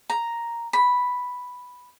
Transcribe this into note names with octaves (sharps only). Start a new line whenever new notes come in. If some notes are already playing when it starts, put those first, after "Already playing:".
A#5
B5